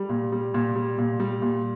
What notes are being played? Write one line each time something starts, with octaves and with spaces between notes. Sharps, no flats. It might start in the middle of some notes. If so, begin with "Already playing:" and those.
Already playing: G3
A#2
G3
A#2
G3
A#2
G3
A#2